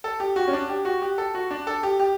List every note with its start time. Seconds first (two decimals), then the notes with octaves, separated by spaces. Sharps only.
0.04 A4
0.20 G4
0.36 F#4
0.48 C#4
0.53 D4
0.69 G4
0.85 F#4
1.02 G4
1.18 A4
1.35 F#4
1.51 D4
1.67 A4
1.83 G4
2.00 G4